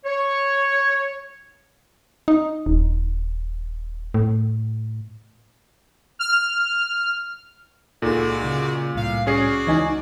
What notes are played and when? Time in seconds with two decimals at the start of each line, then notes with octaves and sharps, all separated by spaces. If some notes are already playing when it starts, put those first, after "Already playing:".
0.06 C#5
2.28 D#4
2.66 D#1
4.14 A2
6.19 F6
8.02 C#2 A#2 G#3 D#4 F#4 A4 D5
8.44 C#3
8.95 C2 A2 F5
9.27 C#4 F#4 G#4 D5 C7
9.67 C#2 E3 D#4 G#5